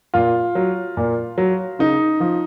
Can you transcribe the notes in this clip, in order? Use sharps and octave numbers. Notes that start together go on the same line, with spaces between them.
A#2 F4
F#3
A#2
F#3
C#3 D#4
F3